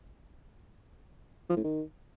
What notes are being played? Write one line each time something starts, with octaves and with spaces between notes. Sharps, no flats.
F3
A2
D#3